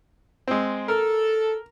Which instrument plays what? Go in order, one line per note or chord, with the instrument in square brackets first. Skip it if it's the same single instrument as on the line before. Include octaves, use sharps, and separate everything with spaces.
[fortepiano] G#3 C4
[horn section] A4 [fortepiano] A#4